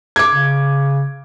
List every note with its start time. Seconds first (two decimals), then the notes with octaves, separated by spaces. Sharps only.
0.16 D6 G#6
0.30 C#3